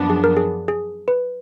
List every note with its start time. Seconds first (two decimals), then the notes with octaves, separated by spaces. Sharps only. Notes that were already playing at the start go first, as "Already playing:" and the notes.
Already playing: F#2 F3 B3 D4
0.10 G#4
0.24 A#4
0.37 G#4
0.68 G#4
1.08 B4